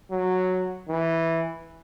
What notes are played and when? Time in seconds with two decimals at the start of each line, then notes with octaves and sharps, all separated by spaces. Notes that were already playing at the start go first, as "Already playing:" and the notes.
0.11 F#3
0.89 E3